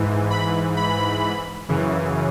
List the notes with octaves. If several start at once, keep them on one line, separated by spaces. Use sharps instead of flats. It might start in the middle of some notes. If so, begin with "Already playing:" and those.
Already playing: G#2 E3
B5
B5
F#2 C#3 E3